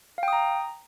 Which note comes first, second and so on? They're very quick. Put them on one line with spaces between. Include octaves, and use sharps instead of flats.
F5 G5 D#6 A#5